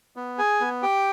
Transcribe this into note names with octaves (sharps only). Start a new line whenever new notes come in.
B3
G#4 G#5
B3
G4 G5